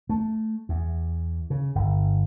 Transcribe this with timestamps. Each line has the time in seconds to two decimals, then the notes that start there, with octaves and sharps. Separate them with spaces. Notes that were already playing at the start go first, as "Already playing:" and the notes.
0.09 A3
0.69 E2
1.50 C#3
1.75 G1